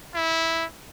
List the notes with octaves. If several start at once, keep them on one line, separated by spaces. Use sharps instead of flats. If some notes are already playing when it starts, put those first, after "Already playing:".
E4